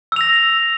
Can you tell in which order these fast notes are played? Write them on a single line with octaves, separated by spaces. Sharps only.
E6 F7 A#6